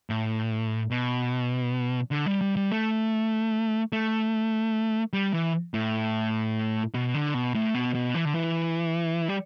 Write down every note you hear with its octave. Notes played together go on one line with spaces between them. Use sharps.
A2
B2
D3
G3
G3
G3
A3
A3
G3
E3
A2
B2
D3
B2
A2
B2
B2
E3
D3
E3
G3